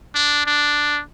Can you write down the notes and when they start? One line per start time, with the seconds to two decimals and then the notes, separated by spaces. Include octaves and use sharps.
0.15 D4
0.46 D4